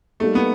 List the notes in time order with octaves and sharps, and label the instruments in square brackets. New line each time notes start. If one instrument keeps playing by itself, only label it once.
[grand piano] G3 A#3 D#4 G4 [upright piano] A3
[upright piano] B3